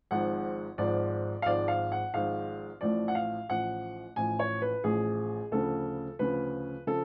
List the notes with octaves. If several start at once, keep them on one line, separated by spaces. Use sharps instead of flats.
G#1 G#2 F3 F#5
G#1 G#2 F3 D5
F5
G#1 G#2 F3 D5
F5
F#5
G#1 G#2 F3 F5
A1 A2 F3 D5
F#5
F5
A1 A2 F3 F#5
A1 A2 F3 G#5
C#5
B4
A1 A2 F3 G#4
D2 C#3 F3 A4
D2 C#3 F3 B4
C#3 F3 A4